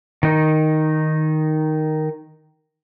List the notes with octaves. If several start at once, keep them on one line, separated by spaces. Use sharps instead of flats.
D#3 D#4